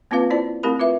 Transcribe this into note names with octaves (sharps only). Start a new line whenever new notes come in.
A#3 C4 C#4 F4 B4 F5
E4 C5 D5 A5
A3 C4 E4 G4 A#4 B5
F4 B4 E5